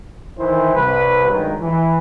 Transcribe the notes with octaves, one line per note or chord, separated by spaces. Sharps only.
D#3 E3 E4 C5
C2 B4
G2 D#3 F#3 G#3
E3